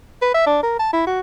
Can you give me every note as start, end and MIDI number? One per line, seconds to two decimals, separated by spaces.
0.22 0.32 71
0.34 0.45 76
0.46 0.60 62
0.63 0.78 70
0.80 0.92 81
0.93 1.03 64
1.07 1.20 66